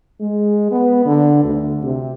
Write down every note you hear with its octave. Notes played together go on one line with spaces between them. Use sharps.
G#3
B3
D3
D2
C3